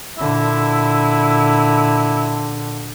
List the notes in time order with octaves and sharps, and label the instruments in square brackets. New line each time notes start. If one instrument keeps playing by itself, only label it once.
[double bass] A#2 D3 [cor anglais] E4